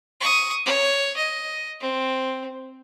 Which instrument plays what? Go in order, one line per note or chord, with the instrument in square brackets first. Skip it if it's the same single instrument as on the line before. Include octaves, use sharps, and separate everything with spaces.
[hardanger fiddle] C#6 D#6
C#5
D#5
C4